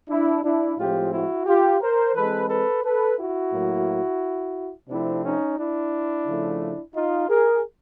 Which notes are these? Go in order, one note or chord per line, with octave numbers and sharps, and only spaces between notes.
D4 E4
D4 E4
A2 F3 G#3 C4 F4 G4
E4 F#4
F4 G4
A#4 C5
E3 G#3 C4 A4 B4
A4 B4
A4 B4
E4 F#4
A2 F#3 A#3
C3 F3 A3 C4 D4 E4
C#4 D#4
D4 E4
C#3 F3 A3
D#4 F4
G#4 A#4